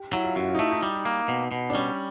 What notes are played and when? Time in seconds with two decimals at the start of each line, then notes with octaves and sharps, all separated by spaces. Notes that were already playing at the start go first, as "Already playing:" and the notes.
Already playing: G4
0.13 F#3 E4
0.24 F4
0.36 F#2 F#4
0.48 F4
0.55 D#4
0.59 A3 E4
0.71 D#4
0.83 G3
1.05 A#3
1.28 B2
1.51 B2
1.70 D4
1.74 G3 C#4